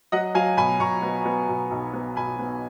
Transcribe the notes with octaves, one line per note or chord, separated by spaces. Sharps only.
F#3 D#5 F#5
F#3 F5 G#5
B2 G#5 B5
B2 A#5 C#6
B3
B3
B2
B1
B3
B2 G#5 B5
B3